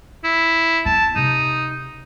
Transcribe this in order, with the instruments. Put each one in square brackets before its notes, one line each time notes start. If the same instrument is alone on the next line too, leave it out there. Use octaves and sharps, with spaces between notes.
[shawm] E4
[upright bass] B3 [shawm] A5
[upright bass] C3 [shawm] D#4